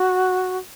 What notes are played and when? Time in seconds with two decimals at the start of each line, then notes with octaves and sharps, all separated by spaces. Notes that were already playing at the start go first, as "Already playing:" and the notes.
Already playing: F#4